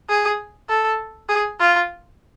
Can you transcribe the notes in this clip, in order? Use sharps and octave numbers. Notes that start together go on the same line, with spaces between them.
G#4
A4
G#4
F4